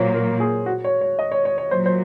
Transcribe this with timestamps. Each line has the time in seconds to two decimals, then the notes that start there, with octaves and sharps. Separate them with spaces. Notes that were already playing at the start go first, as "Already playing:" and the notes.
Already playing: A#2 F#3 A#3 C5 C#5
0.14 A#4
0.40 G#4
0.66 F#4
0.84 C#5
1.01 C#5
1.19 D#5
1.32 C#5
1.45 C#5
1.58 C#5
1.71 A#2 F#3 C5
1.86 C5